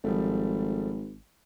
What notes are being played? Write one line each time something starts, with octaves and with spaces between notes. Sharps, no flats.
G#1 F3 G3 A3